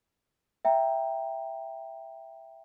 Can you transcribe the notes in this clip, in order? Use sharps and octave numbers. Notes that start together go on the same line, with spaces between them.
E5 G5 A#5